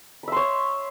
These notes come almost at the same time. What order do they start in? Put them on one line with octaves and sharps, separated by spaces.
B5 E5 C6 C#5